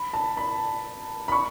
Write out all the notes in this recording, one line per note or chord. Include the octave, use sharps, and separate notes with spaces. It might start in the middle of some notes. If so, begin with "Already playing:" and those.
Already playing: B5
A5
B5
B5
C#6